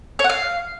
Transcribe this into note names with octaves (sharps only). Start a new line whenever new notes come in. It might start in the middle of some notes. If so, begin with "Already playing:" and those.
C#5
F#5
F5